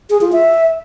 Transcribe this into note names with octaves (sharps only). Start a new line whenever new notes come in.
G#4
F4
E5